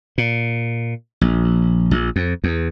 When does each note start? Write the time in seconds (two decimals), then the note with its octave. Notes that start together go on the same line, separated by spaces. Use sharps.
0.18 A#2
1.21 A#1
1.91 A#1
2.16 F2
2.44 E2